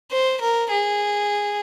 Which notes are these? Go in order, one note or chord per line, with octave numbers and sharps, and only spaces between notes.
C5
A#4
G#4